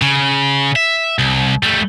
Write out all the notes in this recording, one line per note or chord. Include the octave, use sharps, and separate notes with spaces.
C#3
E5
C2
G3 A3